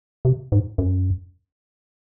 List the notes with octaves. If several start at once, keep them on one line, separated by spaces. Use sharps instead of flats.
C3
G#2
F#2